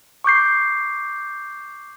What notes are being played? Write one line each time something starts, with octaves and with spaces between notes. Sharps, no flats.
C#6 D6 G6 C7